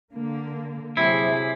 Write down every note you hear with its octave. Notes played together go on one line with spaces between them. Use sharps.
D3 A#3
C3 F#3 E4 G#4 C5